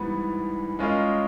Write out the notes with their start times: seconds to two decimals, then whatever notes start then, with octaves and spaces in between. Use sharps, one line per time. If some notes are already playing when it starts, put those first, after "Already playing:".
Already playing: G#2 E3 G3 B3
0.79 G#3 C#4 F4 A#4 D#5